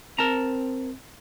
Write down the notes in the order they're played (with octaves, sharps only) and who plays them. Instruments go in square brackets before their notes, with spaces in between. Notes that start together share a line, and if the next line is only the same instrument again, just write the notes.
[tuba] C4 [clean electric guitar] A#4 A5 A#5